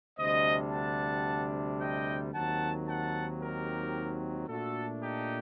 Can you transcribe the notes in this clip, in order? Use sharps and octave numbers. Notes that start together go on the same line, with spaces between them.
D2 C3 G3 D4 C5 D#5
F#5 A5
D#5 G5
D#2 D#3 F#3 C4 F#5 A5
F#5 A5
G4 A#4
A#2 A3 D4 F#4 A4
D#4 G4